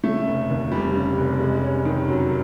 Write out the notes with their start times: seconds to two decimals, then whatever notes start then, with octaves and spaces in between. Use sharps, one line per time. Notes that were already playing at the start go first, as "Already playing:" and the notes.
0.03 C#3 A3
0.27 F1
0.50 D#2
0.72 F1 G3
0.95 C#3
1.18 F1
1.40 G#3
1.63 C#4
1.85 D#3
2.08 F#2 F#3